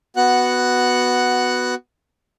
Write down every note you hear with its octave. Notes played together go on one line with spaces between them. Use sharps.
B3 F#4 F#5 F#6